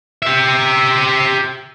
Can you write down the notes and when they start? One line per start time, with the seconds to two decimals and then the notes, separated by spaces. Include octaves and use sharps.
0.22 G4 E5